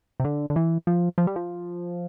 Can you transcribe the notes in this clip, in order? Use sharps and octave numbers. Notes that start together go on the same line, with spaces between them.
C3
D3
D3
E3
F3
F3
G3
F3